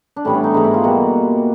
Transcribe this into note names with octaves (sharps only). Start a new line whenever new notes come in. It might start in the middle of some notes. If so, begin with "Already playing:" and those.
D4
A2 E3 G3 B3 C#4
D4
D#4
G#2 E3 G#3 D#4
E4
F4
B2 G3 A#3 F#4